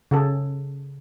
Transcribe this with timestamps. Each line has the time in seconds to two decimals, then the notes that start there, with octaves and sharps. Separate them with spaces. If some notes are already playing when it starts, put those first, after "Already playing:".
0.11 C#3 G#4 A4